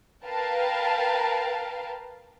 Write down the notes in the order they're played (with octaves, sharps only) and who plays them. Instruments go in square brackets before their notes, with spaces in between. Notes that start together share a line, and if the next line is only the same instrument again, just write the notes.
[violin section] A#4 B4 F5 G5 A5